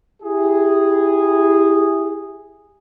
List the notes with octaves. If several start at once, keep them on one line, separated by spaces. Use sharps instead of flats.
E4 G4 G#4